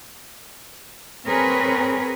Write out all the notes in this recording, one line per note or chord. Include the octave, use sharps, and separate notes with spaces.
C4 G#4 A#4 B4 C#5